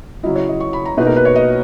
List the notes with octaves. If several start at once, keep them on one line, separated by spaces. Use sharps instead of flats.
C#3 F#3 C#4 E4 D#5
C#5
D#5
C#6
B5
A#5
B2 A#3 D#4 B4
A#4
B4
C#5
D#5